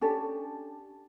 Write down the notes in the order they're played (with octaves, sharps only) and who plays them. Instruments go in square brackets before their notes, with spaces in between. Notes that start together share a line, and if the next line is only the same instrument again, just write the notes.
[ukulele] C#4 D4 G4 A4